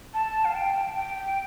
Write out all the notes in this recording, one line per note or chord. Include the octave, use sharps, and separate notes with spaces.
A5
F5
G5
G5